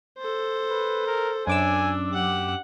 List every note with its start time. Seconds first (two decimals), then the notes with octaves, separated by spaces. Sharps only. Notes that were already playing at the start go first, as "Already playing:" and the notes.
0.18 A4 C5
0.70 B4
1.07 A#4
1.47 F#2 D4 G#5 D6 E6
2.13 G4 F#5